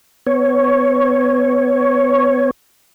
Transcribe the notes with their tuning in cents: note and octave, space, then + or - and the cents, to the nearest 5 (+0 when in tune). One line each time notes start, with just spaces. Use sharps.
B3 +25 C#5 +0